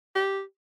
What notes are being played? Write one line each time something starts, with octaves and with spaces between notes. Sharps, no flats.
G4